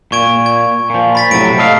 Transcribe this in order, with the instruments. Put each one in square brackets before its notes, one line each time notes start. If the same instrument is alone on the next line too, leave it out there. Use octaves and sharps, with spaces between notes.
[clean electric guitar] A#2 [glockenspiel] C#6 G#6 D7
[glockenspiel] G#6
[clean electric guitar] A#2 F3
[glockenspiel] B5 A6 B6
[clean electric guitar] A2 C3 F#3 [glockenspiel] A6 D7
[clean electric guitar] A4 D#5 F5